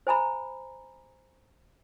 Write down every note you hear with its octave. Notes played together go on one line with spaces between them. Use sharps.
C5 G#5 A#5 B5